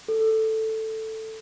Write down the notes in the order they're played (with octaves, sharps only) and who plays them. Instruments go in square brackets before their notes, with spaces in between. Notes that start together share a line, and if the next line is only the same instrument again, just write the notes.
[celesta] A4